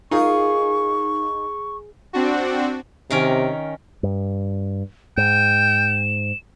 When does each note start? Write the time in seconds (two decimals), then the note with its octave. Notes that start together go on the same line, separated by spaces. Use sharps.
0.11 D#4 F4 G#4 A#4 F5 C#6
2.13 C4 D4 F#4
3.11 C3 D#3 C#4 A#4
4.03 G2
5.17 G#2 G5 E7